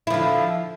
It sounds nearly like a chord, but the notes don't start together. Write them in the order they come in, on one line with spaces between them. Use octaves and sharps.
E4 F3 D3